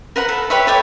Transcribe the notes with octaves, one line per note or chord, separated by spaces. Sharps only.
A#4 B4 F#5 A#5
A4
G4 B4 C#5 E5
A4 C#5 G5 D6